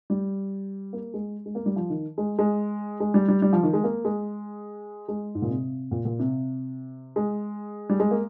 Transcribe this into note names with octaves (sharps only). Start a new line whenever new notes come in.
G3
A#3
G#3
G#3
A#3
G3
F3
D#3
G#3
G#3
G#3
G3
G3
G3
F3
D#3
G#3
A#3
G#3
G#3
G#2
A#2
C3
A#2
A#2
C3
G#3
G3
G#3
A#3